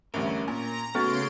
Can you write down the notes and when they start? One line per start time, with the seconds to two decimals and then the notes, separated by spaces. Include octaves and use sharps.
0.14 A1 D2 G2 C#4 A#4
0.47 A#2 A#5
0.95 C#3 A3 B3 C#4 F#4 C6 A6 D7